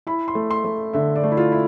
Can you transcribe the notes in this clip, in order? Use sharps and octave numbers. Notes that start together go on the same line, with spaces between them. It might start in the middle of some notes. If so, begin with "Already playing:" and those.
E4 B5
C6
A3
C6
A3
D3 E5
D5
A3
E4
F4
E4